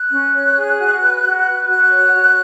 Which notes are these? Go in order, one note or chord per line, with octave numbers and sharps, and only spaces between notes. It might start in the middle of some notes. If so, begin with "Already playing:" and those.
Already playing: F#6
C#4
C#5
G#4
F#4
B4
F#4
B4
F#4 F#6
C#5
F#4